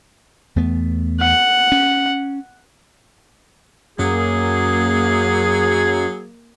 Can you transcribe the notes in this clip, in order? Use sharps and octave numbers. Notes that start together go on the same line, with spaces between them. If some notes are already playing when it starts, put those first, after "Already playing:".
E2 A3 B3
F#5
C#4
F#2 F#3 A#3 G#4